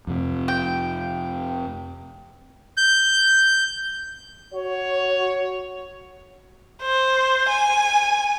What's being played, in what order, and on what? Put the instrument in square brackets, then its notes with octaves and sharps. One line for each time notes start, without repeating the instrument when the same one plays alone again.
[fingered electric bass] F2 C3
[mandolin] G5
[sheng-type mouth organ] G6
[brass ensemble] F#4 C#5
[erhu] C5
G#5